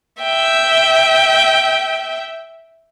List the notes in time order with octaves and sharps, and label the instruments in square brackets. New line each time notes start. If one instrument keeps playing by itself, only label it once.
[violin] E5 G5